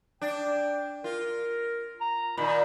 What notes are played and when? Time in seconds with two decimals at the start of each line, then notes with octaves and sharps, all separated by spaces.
0.22 D4 G5
1.04 F4 A#4
2.01 A#5
2.37 A#2 D#3 B5